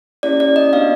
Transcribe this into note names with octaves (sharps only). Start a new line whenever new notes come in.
A#3 C#4 E4 G4 D5
D5
D#5
B3 D4 F#4 F5